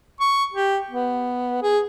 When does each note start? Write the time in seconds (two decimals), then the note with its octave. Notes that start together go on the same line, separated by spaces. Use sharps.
0.20 C#6
0.53 G4
0.90 B3
1.63 G#4